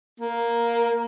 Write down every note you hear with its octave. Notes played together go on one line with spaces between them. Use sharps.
A#3